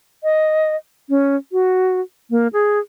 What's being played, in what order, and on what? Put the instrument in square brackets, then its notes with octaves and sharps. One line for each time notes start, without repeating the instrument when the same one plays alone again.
[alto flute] D#5
C#4
F#4
A#3
G#4